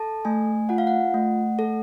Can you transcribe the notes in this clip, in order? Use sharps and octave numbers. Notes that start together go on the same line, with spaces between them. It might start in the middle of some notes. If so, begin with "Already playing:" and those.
Already playing: A4 A5
A3 G#5
F4 F#5
F5
F#5
A3
A4